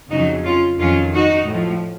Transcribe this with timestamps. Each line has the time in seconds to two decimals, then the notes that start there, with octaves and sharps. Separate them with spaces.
0.10 F2 C#3 F#3 D#4 F#4
0.45 C#4 F4
0.79 F2 D#3 F#3 C#4 F4
1.14 D#4 F#4
1.47 A2 F3